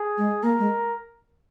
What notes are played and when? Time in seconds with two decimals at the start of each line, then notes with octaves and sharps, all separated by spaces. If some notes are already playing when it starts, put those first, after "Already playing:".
Already playing: G#4
0.18 G#3
0.43 A#3 A#4
0.59 G#3